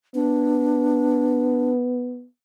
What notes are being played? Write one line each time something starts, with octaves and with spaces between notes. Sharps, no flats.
B3 D4